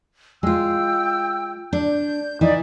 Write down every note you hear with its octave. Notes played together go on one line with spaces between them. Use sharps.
G#3 F4 G5 E6
D4 G6
E3 D#4 D5